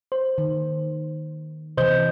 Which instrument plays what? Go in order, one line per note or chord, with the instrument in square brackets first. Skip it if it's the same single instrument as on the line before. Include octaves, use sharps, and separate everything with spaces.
[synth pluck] C5
[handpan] D#3
[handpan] C3 E3 [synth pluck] C5 D#5 G6